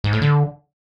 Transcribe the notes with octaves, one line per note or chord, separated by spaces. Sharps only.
G#2
A2
D3